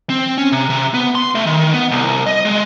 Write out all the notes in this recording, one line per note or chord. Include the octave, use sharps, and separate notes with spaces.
C4
C#4
C3
C3
B3
C6
A3
D#3
B3
C2
D#5
G#3